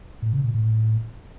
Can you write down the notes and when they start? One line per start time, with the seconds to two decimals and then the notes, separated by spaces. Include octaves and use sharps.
0.22 A2
0.33 C#3
0.44 A#2
0.54 A2